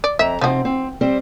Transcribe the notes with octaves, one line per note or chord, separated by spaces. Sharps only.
D5
F2 E5 A#5
C3 F3 C4 D#4 F#4
C4
G3 C4 C5